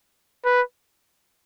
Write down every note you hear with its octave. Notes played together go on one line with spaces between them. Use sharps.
B4